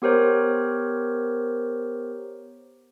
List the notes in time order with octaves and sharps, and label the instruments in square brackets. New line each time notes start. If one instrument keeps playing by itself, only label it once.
[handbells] B3 G4 A#4 C5 C#5